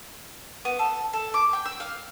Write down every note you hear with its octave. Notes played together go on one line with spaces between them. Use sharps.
B3
A4
A4
D6
G5
E6
F5